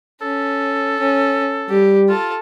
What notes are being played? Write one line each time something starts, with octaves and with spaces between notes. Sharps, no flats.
C#4 A4
C#4
G3 G4
F4 A4